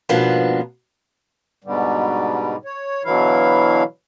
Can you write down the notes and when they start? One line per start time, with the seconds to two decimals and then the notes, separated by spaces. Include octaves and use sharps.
0.09 G#2 B2 F3 A#3 B3 D4
1.64 G#2 B2 D3 G3
2.65 C#5
3.04 B2 D3 E3 F#3 E4 F5